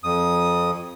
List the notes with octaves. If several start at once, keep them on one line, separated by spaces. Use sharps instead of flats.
F2 D#6